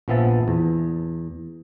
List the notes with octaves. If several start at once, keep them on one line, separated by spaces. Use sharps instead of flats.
A#1 F3 B3 E5 A5
E2